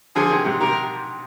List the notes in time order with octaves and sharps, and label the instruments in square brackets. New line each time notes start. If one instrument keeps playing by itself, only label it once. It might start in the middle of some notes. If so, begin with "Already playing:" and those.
[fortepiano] D3 F3 [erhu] G#4
[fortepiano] C3 D#3
G#2 C3
[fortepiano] C3 D#3 [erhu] A#4